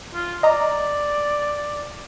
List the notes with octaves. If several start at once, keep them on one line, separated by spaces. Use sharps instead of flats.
F4
D5 D#5 A#5